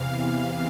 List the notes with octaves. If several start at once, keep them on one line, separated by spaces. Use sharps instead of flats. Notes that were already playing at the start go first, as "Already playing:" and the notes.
Already playing: E2 C3 E3 F5